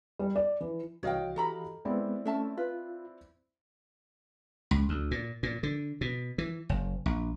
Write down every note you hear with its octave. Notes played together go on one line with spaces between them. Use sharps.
G3
D5
E3
C2 E3 F#4 C#5 D#5 F5 G5
E3 G4 A4 A#5 B5
G#3 B3 C4 E4 D5
A3 C#4 E5 A5
F4 B4
C#2
D2
A#2
A#2
D3
B2
E3
F#1
A#1